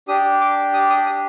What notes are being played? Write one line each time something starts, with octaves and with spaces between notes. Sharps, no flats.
D4 G4 D#6
D6
D#6
D#6
D#6